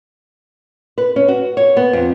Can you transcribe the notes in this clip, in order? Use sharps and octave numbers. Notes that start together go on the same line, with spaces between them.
B4
C#4
F#4
C#5
B3
F2